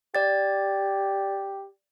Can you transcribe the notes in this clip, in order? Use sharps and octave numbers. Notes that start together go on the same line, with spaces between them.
G4 D5 A6